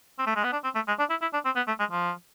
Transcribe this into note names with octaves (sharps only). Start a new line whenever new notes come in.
C4
A3
G#3
B3
D4
C4
A3
G#3
D4
E4
E4
D4
C4
B3
A3
G#3
F3